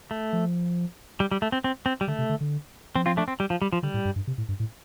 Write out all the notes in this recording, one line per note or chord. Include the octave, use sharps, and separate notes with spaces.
A3
F3
G3
G3
A3
C4
C4
C4
G3
D3 A3
C3
D3
D3
F3 C4
C4 F4
A3 D4
C4
G3
F3
G3
F3
D3 G3
A2
G2
G2
C3
A2
G2
A2